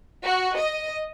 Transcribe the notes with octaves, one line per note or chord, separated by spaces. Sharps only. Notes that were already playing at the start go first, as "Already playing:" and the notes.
F#4
D#5